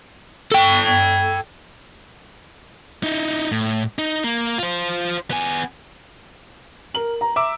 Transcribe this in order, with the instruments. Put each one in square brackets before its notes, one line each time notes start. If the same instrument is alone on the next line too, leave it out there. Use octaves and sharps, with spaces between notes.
[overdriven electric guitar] A4 G5
[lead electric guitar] D#4 E4
A2
D#4
A#3
F4 C5
B3 G#5
[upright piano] A#4 F#7
A#5
[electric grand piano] E5 D6 E6 [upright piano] A#5